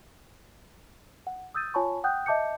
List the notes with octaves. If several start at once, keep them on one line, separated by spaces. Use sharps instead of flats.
F#5
D#6 E6 G6 A6 D#7
F4 C#5 G#5 A5 B5 C#6
F#5 G5 D#6 F#6 G6
D#5 E5 A5 D6 G6 C#7